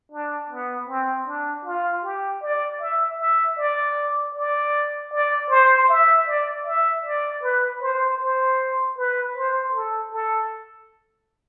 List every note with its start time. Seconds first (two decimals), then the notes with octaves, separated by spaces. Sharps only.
0.12 D4
0.50 B3
0.88 C4
1.27 D4
1.65 F4
2.04 G4
2.42 D5
2.80 E5
3.19 E5
3.58 D5
4.34 D5
5.12 D5
5.50 C5
5.89 E5
6.27 D5
6.66 E5
7.04 D5
7.42 B4
7.81 C5
8.20 C5
8.97 B4
9.36 C5
9.74 A4
10.12 A4